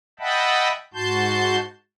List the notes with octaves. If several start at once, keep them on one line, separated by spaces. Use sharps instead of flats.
D#5 E5 F#5 G5 A5 B5
G#2 F#4 A5 C6 G6